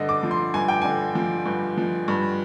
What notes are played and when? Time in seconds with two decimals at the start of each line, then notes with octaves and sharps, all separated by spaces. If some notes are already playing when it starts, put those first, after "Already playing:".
Already playing: G2 D3 D#5
0.09 D6
0.23 F3
0.31 C6
0.54 G2 G#5
0.68 G5
0.82 D3 G#5
1.15 F3
1.46 G2
1.77 F3
2.08 G2